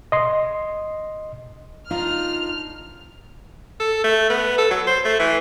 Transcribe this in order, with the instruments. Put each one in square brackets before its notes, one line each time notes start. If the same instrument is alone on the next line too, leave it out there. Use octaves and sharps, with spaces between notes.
[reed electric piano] D#5 C6
[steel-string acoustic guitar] D4 D#4 F4 [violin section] F6
[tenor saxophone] A4
A3
B3
A4
F#3
C5
A3
E3